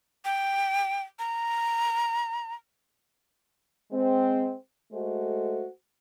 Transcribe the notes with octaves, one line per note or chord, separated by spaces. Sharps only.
G5
A#5
G#3 C4
G#3 A3 F#4 A4 C5